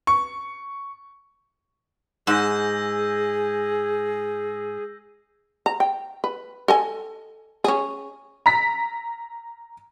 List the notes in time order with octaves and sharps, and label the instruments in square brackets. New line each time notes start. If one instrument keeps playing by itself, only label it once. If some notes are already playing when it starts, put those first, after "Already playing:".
[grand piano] C#6
[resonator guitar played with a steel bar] G#2 [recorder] G#4 [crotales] E6 G6 A#6
[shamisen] A#5
G5
B4
A4 D#5 G#5
C#4 G#4
[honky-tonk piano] A#5 B6